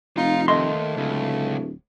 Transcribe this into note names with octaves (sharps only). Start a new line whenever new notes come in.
F1 D#4 F4 F5
D#2 A3 D#5 C6
D1 C#2